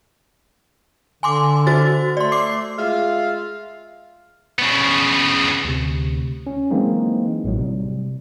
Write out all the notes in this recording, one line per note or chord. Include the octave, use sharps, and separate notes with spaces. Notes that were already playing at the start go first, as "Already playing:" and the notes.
D3 G#5 C6 D6
F#4 C5 A6
A3 D5 C6
D6 C7
G#3 F4 E5 F5
C#3 B3
D2 C3
C#4
E3 F#3 G#3 A#3 C4 D#4
A1 A2 F#3
C3 G3